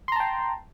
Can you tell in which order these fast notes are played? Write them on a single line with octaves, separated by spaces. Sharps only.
C6 A#5 A5 G5